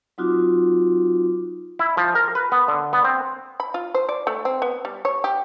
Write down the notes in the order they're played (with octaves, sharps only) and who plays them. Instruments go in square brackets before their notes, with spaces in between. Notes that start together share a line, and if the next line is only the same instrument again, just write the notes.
[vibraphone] F#3 C4 D#4 F4 F#4 D6
[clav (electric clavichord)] E4
F3
A#4
B4
B3
D3
B3
C4
[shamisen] B5
F4
C5
D5
A3
C4
B3
G3
C#5
G4